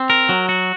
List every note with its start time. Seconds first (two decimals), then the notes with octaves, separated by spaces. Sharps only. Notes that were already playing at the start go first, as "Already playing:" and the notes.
Already playing: C4
0.10 A#4
0.29 F#3
0.49 F#4